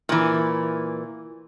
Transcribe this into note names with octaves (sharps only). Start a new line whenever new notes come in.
A#2 E3